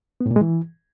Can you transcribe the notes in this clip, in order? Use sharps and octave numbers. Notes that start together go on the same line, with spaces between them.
B3
A2
A#2
G#3
E3